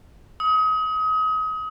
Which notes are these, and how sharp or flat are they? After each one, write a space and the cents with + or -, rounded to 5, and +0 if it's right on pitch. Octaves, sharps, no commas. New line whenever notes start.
D#6 +30